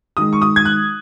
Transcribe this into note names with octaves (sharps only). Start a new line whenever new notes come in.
D#3 G#3 D#6
C#6
D#6
G#6
F#6